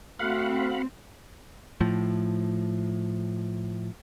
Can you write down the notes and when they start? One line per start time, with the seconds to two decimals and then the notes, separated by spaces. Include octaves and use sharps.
0.19 A3 C4 F#4 F5 F#5 B5
1.81 A2 F3